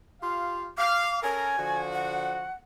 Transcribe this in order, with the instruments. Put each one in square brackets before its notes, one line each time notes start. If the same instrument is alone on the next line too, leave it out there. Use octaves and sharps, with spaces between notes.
[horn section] F4 G4 F5
[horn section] F5 [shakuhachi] D6
[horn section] C#4 A4 A#4 [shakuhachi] G#5
[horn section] D3 F3 F#4
[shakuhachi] F#5